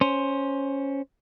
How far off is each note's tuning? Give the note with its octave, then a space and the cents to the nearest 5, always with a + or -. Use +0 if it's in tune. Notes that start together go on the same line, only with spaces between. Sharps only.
C#4 +0 C5 +10